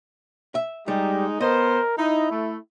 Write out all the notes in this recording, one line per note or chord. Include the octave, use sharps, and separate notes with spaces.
E5
G3 G#3 D#4 G4
B3 A#4 C5 D#5
D#4 E4
A3